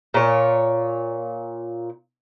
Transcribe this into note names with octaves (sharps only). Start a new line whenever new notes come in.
A#2 C#5